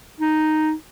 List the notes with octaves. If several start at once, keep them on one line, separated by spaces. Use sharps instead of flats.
D#4